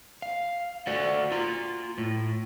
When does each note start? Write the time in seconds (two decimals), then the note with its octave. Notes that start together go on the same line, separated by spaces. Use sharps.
0.22 F5
0.87 F#4 A4 D5 F#5
1.32 F4 A#5
1.98 A2